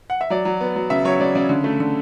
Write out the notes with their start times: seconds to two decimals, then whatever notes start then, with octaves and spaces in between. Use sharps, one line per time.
0.10 F#5
0.21 E5
0.30 F#3 D5
0.45 F#3
0.61 B3
0.76 F#3
0.90 C#3 E5
1.05 F#3 C#5
1.20 C#3 D5
1.35 C#3 D5
1.49 D3
1.64 A3
1.80 D3